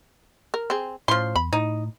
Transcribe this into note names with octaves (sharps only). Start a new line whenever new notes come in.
A#4
C4 G#4
A2 F3 C#4 C6
E2 B5
A2 D#4